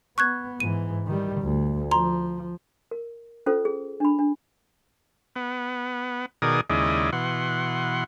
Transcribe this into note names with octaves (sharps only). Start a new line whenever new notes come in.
B3 C#6 F#6 G#6
G#2 E3 D#7
D#3 G3
D2
F3 A#5 C6
A#4
C#4 F4 A4 C5
G#4
D4 B5
D4
B3
B2 D#3 G#4 A#4 D5 D#6
D#2 C#3 G#3 E4 D5 D#5
B2 E3 F#5 C6